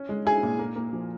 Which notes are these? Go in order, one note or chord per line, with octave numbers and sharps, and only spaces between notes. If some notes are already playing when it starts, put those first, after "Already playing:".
Already playing: C#4
G#3
E4 G#4 G#5
A#2
A#3
A#3
F3